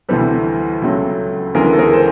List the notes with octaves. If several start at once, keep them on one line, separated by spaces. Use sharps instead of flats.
D2 C3 E3 G3 A4 B4
C#2 C#3 F#3 A3
D2 C#3 E3 G#3 G#4 A#4
A4
G#4 A#4
C5